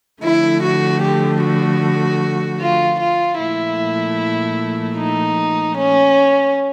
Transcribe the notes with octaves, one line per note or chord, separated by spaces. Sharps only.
D3 F3 A3 E4
F#4
G4
F#4
F4
F4
A#2 F3 A3 E4
D#4
C#4